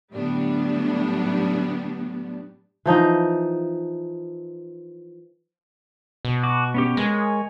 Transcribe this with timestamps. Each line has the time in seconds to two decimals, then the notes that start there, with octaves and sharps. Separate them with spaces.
0.13 A2 D3 F#3 G3 B3 D4
2.86 E3 F3 D#4 D#5
6.25 B2
6.44 F#4 D6
6.74 B3 C#4 G4
6.97 G#3 A#4 C#5 G#5